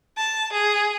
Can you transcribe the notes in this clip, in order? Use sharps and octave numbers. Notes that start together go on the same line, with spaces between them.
A5
G#4